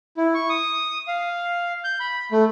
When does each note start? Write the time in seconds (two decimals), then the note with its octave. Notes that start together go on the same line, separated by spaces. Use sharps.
0.17 E4
0.34 C#6
0.49 D#6
1.08 F5
1.84 G6
2.00 B5
2.32 A3